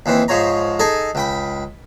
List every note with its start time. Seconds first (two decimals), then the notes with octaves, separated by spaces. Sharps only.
0.06 D#2 E3 C4
0.28 G#2 F3 C#5 A#5
0.79 D#4 G#4 A4 D#5 G#5
1.15 C#2 G5 B5